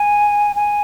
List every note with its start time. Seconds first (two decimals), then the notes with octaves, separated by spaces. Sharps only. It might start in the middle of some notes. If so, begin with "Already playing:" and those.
Already playing: G#5
0.56 G#5